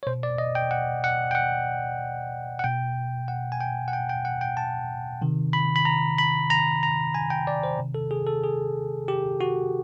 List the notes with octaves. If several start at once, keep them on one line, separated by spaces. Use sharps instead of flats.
C#5
B2 C5
D5
D#5
G5
F#5
F#5
G5
F#5
F#5
B2 G5
F#5
G#5
G5
F#5
G5
G5
F#5
G5
A5
C3 D#3
B5
B5
A#5
B5
A#5
A#5
G#5
G5
D5
C5
C3 D#3
A4
G#4
A4
G#4
G4
F#4